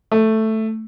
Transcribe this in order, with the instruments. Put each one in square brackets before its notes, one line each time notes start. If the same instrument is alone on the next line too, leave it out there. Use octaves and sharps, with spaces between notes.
[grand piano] A3